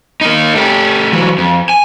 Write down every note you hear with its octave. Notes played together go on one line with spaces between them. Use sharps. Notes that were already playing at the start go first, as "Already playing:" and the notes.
A#3 D#4
A3 G4
E3 F#3
F2
G#5